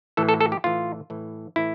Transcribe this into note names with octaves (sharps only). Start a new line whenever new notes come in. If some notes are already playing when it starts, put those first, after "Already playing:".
A2 E3 A4
A4
A4
G4
A2 E3 F4
A2 E3
A2 E3 E4